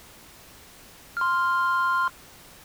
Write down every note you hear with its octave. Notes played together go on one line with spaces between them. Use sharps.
C6 F6